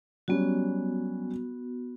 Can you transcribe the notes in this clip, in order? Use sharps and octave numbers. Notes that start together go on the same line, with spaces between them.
F#3 G3 B3 C#4 F#4